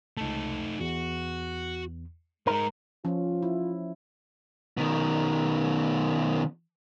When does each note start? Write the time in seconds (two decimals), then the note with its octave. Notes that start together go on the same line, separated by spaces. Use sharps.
0.17 C#2 A3 D#4 A5
0.81 E2 F#4
2.47 G#3 D#4 A#4
3.05 F3 C#4 F4
3.43 E4
4.77 B2 D#3